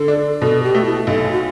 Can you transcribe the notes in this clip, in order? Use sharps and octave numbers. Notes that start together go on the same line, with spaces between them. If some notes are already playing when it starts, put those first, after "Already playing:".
Already playing: D3 A4
D4
B2 A4
G4
A3
E4
B1 A4
F#4